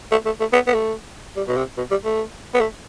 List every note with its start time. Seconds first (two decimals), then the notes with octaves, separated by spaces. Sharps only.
0.11 A3
0.25 A3
0.40 A3
0.53 B3
0.67 B3
0.74 A3
1.36 G3
1.47 B2
1.56 C3
1.77 B2
1.91 G3
2.05 A3
2.54 B3
2.60 A3